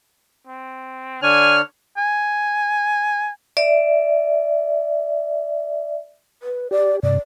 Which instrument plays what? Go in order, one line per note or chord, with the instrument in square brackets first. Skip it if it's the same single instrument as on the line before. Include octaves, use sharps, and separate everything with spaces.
[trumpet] C4
[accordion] D3 D4 C#5 [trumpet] G#5 [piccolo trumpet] F6
[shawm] G#5
[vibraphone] D5 E5
[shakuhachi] B4
[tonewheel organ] G4 [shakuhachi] D5
[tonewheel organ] G2 C3 [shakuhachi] D5